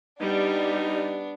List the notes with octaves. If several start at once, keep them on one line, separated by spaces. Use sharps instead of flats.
G3 B3 D4 D#4